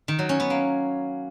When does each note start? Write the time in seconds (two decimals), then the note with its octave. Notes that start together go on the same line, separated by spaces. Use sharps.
0.08 D#3
0.19 F#3
0.29 C#4
0.40 B3
0.50 A#3